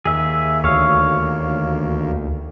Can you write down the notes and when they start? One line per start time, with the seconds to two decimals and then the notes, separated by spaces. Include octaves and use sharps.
0.05 D#2 G#4 E5
0.64 D2 C#5 F5